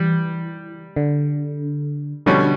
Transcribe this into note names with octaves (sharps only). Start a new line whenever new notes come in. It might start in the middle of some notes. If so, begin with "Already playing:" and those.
Already playing: E3 G3
D3
B2 D3 G3 C#4